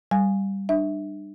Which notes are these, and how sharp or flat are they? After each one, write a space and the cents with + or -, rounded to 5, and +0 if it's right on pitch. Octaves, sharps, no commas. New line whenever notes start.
G3 +0 G#5 +0
D4 +35 E5 -20